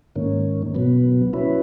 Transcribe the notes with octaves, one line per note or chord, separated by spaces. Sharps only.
G#2 D#3 A#3 C#4
B2 F#3 B3
F#3 C#4 E4 B4